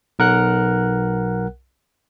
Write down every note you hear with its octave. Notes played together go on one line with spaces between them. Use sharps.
B1 A#4 F#5 F#6